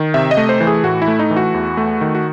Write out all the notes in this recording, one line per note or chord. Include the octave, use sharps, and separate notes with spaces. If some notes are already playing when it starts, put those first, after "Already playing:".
Already playing: D#3
C3 E5
D#5
A3
C5
E3
G#4
A2 F#4
E4
A3
D#4
E3
F#4
E2
A3
D#3
F#4